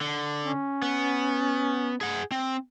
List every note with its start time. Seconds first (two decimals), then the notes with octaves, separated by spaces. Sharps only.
0.01 D3
0.44 C#4
0.82 B3
2.01 G#4 F#5
2.31 C4